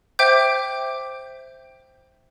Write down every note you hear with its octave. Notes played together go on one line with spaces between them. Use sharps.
C5 E5 G5 D6 G6